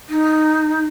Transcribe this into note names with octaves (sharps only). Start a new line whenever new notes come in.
D#4